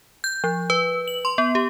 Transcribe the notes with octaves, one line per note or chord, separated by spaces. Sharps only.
G6
F3
B4
F#7
C6
B3
G4